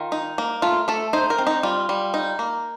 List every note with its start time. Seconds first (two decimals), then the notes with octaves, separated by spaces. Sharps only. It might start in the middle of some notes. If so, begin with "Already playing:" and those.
Already playing: D#3 F4
0.12 D#4
0.38 A#3
0.62 A3 F4
0.88 A3 A4
1.13 D#4 C5
1.30 A#4
1.38 C4
1.47 D#4
1.63 G3 F4
1.89 G3
2.14 D#4
2.39 A#3